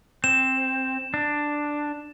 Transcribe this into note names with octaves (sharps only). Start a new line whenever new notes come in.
C4 E7
D4